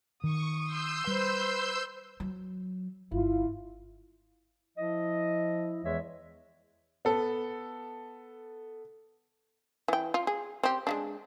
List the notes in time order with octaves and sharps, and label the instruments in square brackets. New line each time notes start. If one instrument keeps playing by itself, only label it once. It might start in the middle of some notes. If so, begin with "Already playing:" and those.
[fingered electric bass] D#3 [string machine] C#6 [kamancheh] D#6
[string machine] C6 E6 G6
[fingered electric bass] G3 [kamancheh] B4 C5
[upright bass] F#3
[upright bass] G1 [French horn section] E4 F4
[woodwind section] F3 E4 D#5
E2 E3 G#3 C#5 E5
[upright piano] B3 A4
[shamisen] E3 G5
F4
G#4
C4 G4
G#3 A3 D4